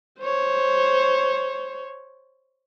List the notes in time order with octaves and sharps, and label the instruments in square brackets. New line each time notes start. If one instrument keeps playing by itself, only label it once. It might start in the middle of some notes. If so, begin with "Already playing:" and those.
[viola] C5 C#5